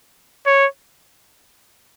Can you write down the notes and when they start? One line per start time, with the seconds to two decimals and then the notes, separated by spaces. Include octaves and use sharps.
0.46 C#5